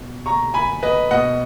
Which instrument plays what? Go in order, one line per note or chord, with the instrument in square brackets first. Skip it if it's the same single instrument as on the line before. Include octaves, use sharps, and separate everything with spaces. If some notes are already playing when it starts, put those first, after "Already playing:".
Already playing: [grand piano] B2
A#5 C#6
G#5 B5
B4 D#5
B2 D#5 F#5